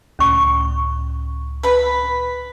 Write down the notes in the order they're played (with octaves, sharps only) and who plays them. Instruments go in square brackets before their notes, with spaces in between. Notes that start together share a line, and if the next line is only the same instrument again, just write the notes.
[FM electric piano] C#2 A2 [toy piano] C#4 C#6
[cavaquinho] B4 B5